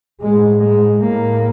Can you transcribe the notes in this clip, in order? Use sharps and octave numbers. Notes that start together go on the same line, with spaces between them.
A2 G#3
G#3
A2 A#3